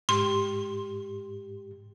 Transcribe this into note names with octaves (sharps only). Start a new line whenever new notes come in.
G#2 G4 C6